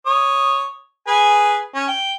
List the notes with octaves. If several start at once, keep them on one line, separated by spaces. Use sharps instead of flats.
C#5 D#6
G#4 B4 G#5
C#4
G5